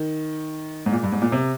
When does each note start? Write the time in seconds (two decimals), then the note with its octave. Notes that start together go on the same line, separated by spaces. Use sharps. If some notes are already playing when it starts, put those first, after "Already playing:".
Already playing: D#3
0.86 G#2
0.92 A#2
1.03 G2
1.12 G#2
1.22 A#2
1.32 C3